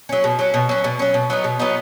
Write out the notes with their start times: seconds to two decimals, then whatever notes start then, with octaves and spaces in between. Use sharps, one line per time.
0.09 F#3 C#4
0.24 B2
0.39 F#3 C#4
0.54 B2
0.69 F#3 C#4
0.84 B2
0.99 F#3 C#4
1.14 B2
1.30 F#3 B3 D#4
1.44 B2
1.59 F#3 B3 D#4